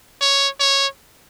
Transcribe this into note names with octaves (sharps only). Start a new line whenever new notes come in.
C#5
C#5